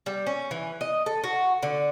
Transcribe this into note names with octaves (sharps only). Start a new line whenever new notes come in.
G3
C#4
E3
D#5
A4
F#4
D3